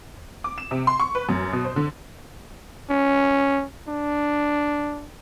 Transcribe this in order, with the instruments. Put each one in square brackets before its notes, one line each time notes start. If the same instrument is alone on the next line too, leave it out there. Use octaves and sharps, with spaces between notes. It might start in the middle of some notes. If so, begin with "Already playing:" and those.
[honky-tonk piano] D6
E7
C3
C6
C#6
B4
F#2
B2
C5
D3
[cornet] C#4
D4